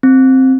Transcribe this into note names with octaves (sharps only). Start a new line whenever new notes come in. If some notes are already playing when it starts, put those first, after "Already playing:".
C4